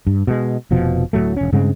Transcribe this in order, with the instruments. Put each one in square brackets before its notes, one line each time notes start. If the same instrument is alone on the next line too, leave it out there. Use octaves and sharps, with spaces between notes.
[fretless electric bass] G2
B2 G#3
F1 B2 F3
D1 A2 F#3 A3
E1 C#4
G2 C#3 G#3 C4